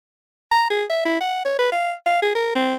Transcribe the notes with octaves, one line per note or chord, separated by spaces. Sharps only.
A#5
G#4
E5
E4
F#5
C#5
B4
F5
F5
G#4
A#4
C4